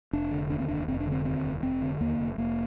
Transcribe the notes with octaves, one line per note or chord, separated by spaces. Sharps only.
F1 D4
D3
D#2 D4
C4
F1 D4
F1 C4
D4
D3 C4
D#2 C4
F1
F1 C4
D3
D#2 A#3
F1
F1 A#3